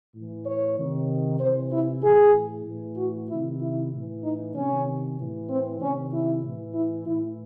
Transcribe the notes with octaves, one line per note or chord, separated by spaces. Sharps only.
A2 E3
C#5
C3 D#3
C3 E3 C5
E4
A2 E3 G#4
A2 E3
F#4
C3 D#3 E4
E4
A2 E3
D#4
C3 D#3 C#4
A2 E3
C4
C3 D#3 C#4
E4
A2 E3
E4
A2 E3 E4